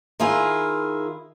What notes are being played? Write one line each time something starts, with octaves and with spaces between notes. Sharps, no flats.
D#3 E4 F4 G#4